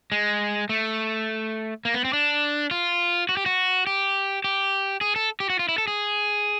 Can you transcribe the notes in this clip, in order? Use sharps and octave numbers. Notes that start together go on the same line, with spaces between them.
G#3
A3
A#3
B3
C4
D4
F4
F#4
G4
F#4
G4
G4
G#4
A4
G4
F#4
F4
E4
A4
G#4